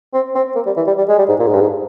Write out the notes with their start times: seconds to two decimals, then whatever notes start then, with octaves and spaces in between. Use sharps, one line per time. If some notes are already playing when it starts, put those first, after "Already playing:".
0.14 C4
0.35 C4
0.55 A#3
0.66 G3
0.77 E3
0.87 G3
0.98 G3
1.09 G#3
1.19 G3
1.29 G#2
1.39 A#2
1.47 G#2
1.54 G2
1.61 G#2